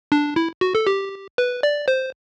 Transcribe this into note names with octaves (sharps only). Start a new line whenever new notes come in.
D4
E4
F#4
A4
G4
B4
D5
C5